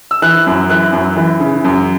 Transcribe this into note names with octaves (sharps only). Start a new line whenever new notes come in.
E6
E3 F#6
F#2
E3 F#6
F#2
E3
C#3
F#2